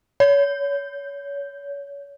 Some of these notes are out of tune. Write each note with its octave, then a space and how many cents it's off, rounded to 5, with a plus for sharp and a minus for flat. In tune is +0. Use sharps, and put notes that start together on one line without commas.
C#5 +30